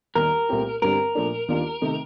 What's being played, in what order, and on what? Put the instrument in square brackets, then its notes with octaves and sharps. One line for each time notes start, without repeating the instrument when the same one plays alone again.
[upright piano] D#2 D#3 G3 A#3 [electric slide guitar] A#4
[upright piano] C2 A#2 A3 C4 G4
[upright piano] G2 D3 G3 C4 [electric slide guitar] A#4
[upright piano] A#2 F3 A3 D4
D#2 D#3 A#3 D4 F4
C3 D#3 A3 D#4